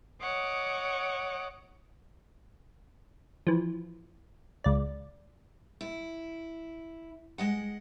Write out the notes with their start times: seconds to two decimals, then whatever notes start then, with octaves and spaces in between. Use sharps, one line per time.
0.21 C#5 D#5 F#5 D6
3.47 E3 F3
4.64 C#2 D5
5.81 E4
7.38 G#3 D#5 F#5